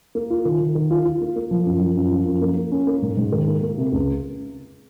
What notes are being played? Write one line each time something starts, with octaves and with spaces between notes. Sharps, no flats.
A#3
F4
D#3
D#3
D#3
F4
F4
A#3
A#3
F3
F#2
F3
F#2
F3
F#2
A#3
A#3
C#4
A#3
G#2
G#2
D#3
A#3
A#3
C3
C#2